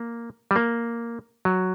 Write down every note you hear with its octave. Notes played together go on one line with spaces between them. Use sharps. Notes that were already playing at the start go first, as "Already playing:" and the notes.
Already playing: A#3
G3
A#3
F#3